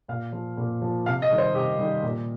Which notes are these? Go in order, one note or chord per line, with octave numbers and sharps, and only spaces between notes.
A#2 F5
F3
A#2
F3
C3 F5
D#5
D#3 G3
C5
C3 G4
D#3 G3
A#2